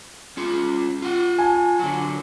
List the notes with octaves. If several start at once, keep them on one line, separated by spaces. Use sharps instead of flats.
C#4 F4
F4 F#5
G#5 A5
D3 F#3